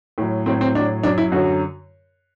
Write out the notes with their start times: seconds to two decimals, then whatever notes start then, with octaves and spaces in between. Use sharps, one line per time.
0.18 A2 F#3
0.46 A2 F#3 C4
0.61 C4
0.75 A2 F#3 D4
1.03 F#2 F#3 D4
1.18 E4
1.32 F#2 D3 F#3 F#4